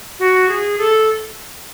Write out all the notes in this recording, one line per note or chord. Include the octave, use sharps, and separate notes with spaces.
F#4
G#4
A4